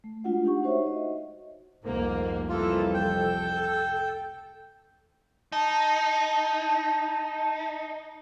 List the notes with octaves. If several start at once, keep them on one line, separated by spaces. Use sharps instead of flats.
A3
G#3 A3 D4 F4 F#4 F#5
D4 D#4 G4 F#5 C#6
D#4 F#4 C5 C#5 E5
D#5
F1 C2 F2 G#2 A#3
E3 A#3 F4 A4
A4 G5
D#4 A5